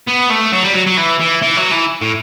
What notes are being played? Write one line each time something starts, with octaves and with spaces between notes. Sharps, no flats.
B3
A3
F#3
G3
F#3
F#3
E3
E3
E3
F#3
E3
A2